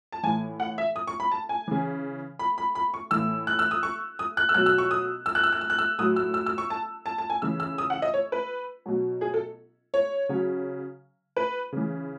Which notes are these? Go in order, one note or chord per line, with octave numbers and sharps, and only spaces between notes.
A5
A2 E3 G#5
F#5
E5
D#6
C#6
B5
A5
G#5
C#3 E3
B5
B5
B5
C#6
A2 E3 E6
F#6
E6
D#6
C#6
D#6
F#6
E6
B2 F#3 F#6
E6
C#6
D#6
E6
F#6
E6
F#6
E6
F#6
E6
A2 F#3 D#6
E6
E6
E6
C#6
A5
A5
A5
G#5
C#3 E3 E6
E6
D#6
F#5
D#5
C#5
B4
B2 F#3
G#4
A4
C#5
C#3 F#3
B4
C#3 E3